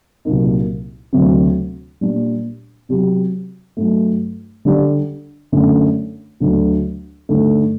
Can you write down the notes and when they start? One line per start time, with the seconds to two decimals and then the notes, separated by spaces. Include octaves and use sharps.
0.25 C2 A#2 F#3 A#3 D#4
1.13 D2 C3 F#3 C4
2.01 A#2 G3 D4
2.89 C3 F#3 C4 G4
3.77 G2 F#3 A3
4.65 D3 G3 D4 G4 D5
5.52 F#2 D3 A3
6.40 D2 D3 F#3
7.29 G2 D3 A3 D#4